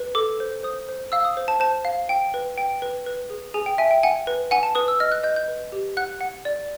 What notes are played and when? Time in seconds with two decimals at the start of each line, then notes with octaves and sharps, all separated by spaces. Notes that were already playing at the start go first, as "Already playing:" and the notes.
Already playing: B4
0.15 A4 D6
0.40 C5
0.63 C5 D#6
0.89 C5
1.12 F5 E6
1.25 D#6
1.37 C5
1.48 A5
1.60 C5 A5
1.85 F5
2.09 G5
2.34 B4
2.58 G5
2.82 B4
3.06 B4
3.30 G#4
3.54 G#4 G#5
3.66 G5
3.78 E5 G#5
3.91 G5
4.03 F#5 G#5
4.27 B4
4.51 F#5 G#5
4.63 A5
4.75 B4 D#6
4.88 E6
5.00 D#5 F6
5.12 F#6
5.23 D#5 G6
5.36 G6
5.48 B4
5.72 G4
5.97 F#5 F#6
6.21 F#5
6.45 D5